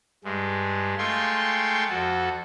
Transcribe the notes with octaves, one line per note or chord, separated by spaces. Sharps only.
G2 G#3
G#3 A3 F4 G5 C6 C#6
F2 F#4 A4